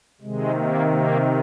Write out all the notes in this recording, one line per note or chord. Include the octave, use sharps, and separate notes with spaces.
C3 D#3 G#3
A#3
A#3